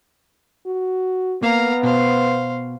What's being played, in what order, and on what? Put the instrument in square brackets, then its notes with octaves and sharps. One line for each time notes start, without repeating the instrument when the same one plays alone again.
[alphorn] F#4
[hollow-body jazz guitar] A#3 [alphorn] B3 [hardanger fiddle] F5 A#5
[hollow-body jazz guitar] B2 [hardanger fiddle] C5 F5